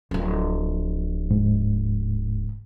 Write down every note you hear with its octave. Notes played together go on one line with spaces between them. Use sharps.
D1 F3
G#2